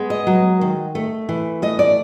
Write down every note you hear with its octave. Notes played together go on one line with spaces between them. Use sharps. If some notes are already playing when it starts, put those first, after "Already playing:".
Already playing: G#3 B3
D#5
F#3
D#3
A3
E3
A3 D#5
D5